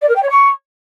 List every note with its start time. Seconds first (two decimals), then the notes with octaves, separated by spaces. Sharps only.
0.02 D5
0.09 A#4
0.16 G5
0.22 C#5
0.29 C#6